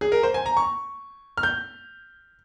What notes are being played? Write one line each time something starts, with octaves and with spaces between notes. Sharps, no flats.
G#4
A#4
C5
G#5
A#5
C#6
F6
G6